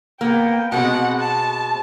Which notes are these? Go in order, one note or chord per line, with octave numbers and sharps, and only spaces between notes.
A#3 B3 G5
B2 G#3 C4 F#5
A5